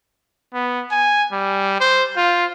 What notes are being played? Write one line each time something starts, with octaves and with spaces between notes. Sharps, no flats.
B3
G#5
G3
C5
F4